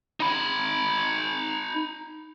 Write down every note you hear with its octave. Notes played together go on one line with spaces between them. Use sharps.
D#4 B5